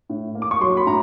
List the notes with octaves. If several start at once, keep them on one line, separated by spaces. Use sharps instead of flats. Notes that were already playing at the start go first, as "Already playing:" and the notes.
A2
A#3
D6
C#6
F#3 C6
B5
A2 A#5